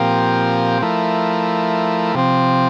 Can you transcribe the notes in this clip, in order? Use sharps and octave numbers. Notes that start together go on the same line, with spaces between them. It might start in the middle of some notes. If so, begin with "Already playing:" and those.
Already playing: A#2 F3 C4 G4 A#4
F3 A3 E4 A#4
C3 F3 C4